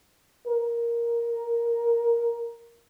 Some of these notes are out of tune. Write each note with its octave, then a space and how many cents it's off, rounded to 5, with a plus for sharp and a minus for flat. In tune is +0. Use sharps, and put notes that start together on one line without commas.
A#4 +5